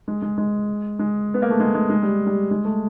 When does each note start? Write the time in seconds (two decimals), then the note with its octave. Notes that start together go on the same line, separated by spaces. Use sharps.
0.08 G#3
0.22 G#3
0.38 G#3
0.99 G#3
1.34 B3
1.42 A#3
1.50 A3
1.60 G#3
1.74 G#3
1.89 G#3
2.03 G3
2.27 G3
2.51 G#3
2.65 A3